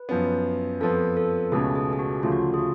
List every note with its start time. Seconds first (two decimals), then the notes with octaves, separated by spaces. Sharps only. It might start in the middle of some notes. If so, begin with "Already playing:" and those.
Already playing: B4
0.09 F#2 F3 B3
0.80 F2 F3 B3 A4
1.17 A4
1.52 C#2 B2 A3 C#4 G#4
1.75 G#4
1.93 G#4
1.99 F#4
2.23 D2 C#3 F3 A3 F4
2.32 F#4
2.42 F4
2.54 G#4
2.59 F#4